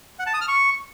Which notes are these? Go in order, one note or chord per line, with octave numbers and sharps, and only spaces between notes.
F#5
A5
D#6
F6
C#6